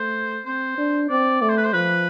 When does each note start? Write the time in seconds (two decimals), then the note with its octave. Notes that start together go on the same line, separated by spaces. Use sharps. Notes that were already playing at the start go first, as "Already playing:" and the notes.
Already playing: A3 C5
0.45 C4 C5
0.78 D4
1.09 C4 D5
1.41 A3 D5
1.49 C5
1.57 B4
1.65 C5
1.73 F3 B4